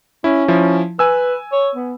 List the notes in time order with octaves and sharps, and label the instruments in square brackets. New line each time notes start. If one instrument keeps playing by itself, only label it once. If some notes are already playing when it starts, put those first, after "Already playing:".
[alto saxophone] C#4 [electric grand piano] E4
[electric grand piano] F3 E4
[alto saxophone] B4 [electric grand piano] G#5 E6
[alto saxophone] C#5
B3